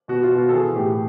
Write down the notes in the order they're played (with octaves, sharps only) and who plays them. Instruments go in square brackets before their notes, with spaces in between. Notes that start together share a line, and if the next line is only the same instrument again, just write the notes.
[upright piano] B2 F#4
F4
B2
F#4
A4
E3 G#4
A2 G4